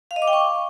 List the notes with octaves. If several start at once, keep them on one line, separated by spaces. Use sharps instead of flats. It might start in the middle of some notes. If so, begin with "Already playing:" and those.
F5
D#5
D6
G5
C#6